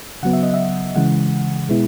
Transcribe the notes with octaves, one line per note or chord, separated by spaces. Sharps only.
C#3 F#3 B3 F#5
E5
D#5
E5
C#3 E3 G#3 F#5
B2 G#3 B3 E4